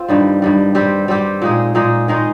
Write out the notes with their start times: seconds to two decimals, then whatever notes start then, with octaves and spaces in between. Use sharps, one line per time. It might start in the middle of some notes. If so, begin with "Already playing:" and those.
Already playing: C4 F4
0.08 G2 D#3 G3
0.42 G2 D#3 G3
0.75 G3 C4 G4
1.08 G3 C4 G4
1.42 A#2 G#3 D#4 G#4
1.75 A#2 G#3 D#4 G#4
2.08 D#3 G#3 D#4